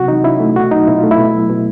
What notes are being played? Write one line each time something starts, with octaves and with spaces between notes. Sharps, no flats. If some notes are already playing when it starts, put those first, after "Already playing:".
Already playing: C3 F#3 F#4
E3 D#4
C#4 E4
A3
B2 F#4
F#3 D#4
B2 E4
A3 F4
E4
B2
F#3
B2